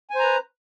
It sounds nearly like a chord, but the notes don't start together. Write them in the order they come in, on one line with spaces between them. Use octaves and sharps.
G#5 C5 A#5 B4